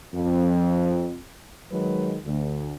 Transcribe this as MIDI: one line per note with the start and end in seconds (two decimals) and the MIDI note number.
0.14 1.19 41
1.72 2.17 51
1.72 2.17 54
1.72 2.17 56
1.72 2.17 71
2.25 2.75 38